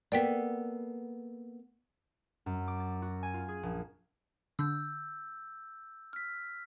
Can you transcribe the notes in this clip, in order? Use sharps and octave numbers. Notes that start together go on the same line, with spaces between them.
A#3 B3 A4 D5 G5 B6
F#2
D6
A6
F#4
G#5
F4
G#4
A#1
D3 E6 G6
F6 B6